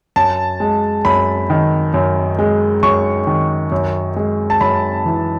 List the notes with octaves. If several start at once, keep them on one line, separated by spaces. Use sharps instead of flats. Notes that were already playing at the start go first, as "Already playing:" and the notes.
F#2 A5
G#3
F#2 B5
D#3
F#2
G#3
F#2 C#6
D#3
F#2
G#3
A5
F#2 B5
E3